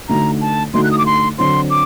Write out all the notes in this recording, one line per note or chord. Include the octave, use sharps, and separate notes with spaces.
D3 A3 D#4 F#4 A#5
A5
D3 A3 D#4 F#4 C6
F#6
D#6
D6
C6
D3 F#3 C4 C6
D6